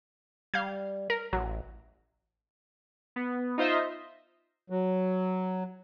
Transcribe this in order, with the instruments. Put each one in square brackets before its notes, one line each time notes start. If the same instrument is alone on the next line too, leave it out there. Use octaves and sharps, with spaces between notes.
[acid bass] G3 [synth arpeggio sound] F5 G6 G#6
[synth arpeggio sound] A#4
[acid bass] A1 [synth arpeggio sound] F#3
[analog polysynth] B3
D#4 F4 C5 D#5 E5
[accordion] F#3